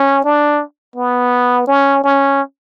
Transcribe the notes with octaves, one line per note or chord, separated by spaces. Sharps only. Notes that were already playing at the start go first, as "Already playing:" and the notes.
Already playing: C#4
D4
B3
C#4
C#4